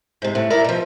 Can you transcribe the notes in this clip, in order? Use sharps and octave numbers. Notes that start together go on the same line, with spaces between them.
G#2 C3
A2
E4 A#4 D5
B2 F3